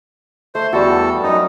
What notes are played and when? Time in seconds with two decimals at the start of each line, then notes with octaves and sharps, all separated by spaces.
0.55 A3 C5
0.73 E2 G3 F#4 A4
1.23 F#2 D#4